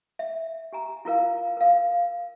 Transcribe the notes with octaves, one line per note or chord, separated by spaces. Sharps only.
E5
G4 G#5 A#5
E4 F4 A#4 F5
A#4 F5